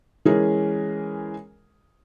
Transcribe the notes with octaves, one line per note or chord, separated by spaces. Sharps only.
E3 G#3 C#4 G#4 A#4